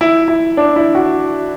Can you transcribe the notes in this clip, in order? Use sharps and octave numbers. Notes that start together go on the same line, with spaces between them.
E4
E4
D4
E4
F#4